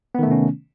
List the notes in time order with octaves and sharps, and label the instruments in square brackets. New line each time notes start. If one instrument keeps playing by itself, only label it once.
[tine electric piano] B3
D#3
A3
C3
C#4